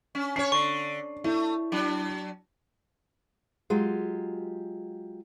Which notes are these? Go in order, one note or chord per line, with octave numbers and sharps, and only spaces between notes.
C#4
C#4 C#5 C7
D3 C#6
A3 E4
F#3 D4
F#3 G#3 F4 G4